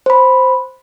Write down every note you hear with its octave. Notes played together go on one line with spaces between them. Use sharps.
C5 B5